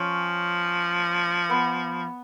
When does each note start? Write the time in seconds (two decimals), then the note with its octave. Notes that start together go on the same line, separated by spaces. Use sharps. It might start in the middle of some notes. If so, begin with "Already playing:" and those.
Already playing: F3 C#4
1.50 B3